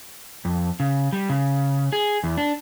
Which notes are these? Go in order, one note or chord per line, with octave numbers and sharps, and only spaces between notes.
F2
C#3
G3
C#3
G#4
E2
D4